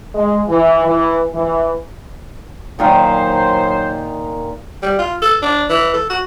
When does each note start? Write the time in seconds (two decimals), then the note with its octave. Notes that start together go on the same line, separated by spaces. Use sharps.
0.15 G#3
0.49 E3
0.85 E3
1.34 E3
2.79 A#2 D#3 F#3 C5 F5
4.83 G3
4.99 F4
5.22 A4
5.42 D4
5.69 E3
5.94 A4
6.10 F#4